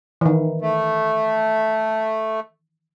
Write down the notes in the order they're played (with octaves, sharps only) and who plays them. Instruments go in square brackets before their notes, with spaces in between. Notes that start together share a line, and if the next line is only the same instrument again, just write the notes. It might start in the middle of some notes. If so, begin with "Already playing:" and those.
[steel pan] D#3 E3
[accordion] A3